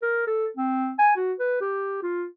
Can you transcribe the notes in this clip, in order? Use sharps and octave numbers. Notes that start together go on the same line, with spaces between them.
A#4
A4
C4
G#5
F#4
B4
G4
F4